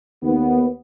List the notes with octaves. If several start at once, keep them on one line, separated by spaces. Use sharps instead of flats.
D#2 B3